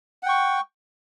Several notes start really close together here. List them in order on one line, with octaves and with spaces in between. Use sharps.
F#5 G5 C#6